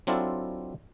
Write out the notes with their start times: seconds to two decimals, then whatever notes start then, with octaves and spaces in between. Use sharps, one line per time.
0.07 F#3 C4 D4 E4 F4 A4